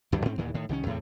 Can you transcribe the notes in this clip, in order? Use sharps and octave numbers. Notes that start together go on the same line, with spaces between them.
D2 G2 E3 G3
G#2 C4 C#4
D#2 A#2 D#3 E3
A2 D#3
C2 D#3 F3 C#4
E2 A2 C3